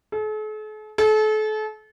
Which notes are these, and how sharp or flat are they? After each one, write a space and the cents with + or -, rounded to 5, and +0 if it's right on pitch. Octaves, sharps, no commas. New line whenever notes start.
A4 -45
A4 -35